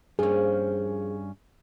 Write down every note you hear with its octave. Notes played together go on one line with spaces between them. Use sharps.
G2 F3 A#3 C#4 G#4